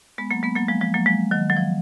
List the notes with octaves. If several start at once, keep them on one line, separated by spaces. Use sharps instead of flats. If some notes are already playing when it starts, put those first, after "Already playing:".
G#3 B3
F#3 A#3
G#3 B3
F#3 A#3
F3 G#3
F3 G#3
F#3 A#3
F3 G#3
D#3 F#3
F#3
F3